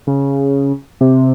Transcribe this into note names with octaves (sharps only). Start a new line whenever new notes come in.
C#3
C3